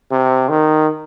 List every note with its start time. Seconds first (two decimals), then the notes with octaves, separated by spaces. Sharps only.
0.11 C3
0.49 D#3